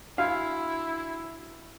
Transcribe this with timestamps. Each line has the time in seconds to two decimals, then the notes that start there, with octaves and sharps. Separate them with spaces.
0.18 D4 E4 F#4 F5 C6